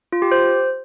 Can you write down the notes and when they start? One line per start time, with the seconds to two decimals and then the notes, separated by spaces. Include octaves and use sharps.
0.12 F4
0.22 G4
0.32 C5